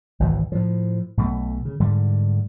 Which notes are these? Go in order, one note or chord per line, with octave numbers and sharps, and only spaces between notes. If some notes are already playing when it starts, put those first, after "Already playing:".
G#1 C#2 B2 E3
A2 F3
B1 B2 A3
C#3
G#2 D3 G3